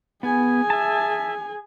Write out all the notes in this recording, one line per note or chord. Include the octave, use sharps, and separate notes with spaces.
B3 G#4 G#5
E5 A5